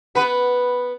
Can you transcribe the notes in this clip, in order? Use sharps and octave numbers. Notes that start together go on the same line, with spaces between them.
B3 B4